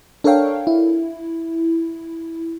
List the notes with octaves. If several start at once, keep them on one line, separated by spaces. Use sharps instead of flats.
D4 A4 A#4 C#5 F5 G5
E4